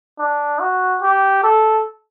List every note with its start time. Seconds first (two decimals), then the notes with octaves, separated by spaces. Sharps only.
0.19 D4
0.60 F#4
1.02 G4
1.44 A4